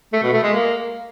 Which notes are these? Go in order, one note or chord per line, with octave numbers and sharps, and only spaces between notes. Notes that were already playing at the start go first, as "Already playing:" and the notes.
A3
B2
A3
G#3
A#3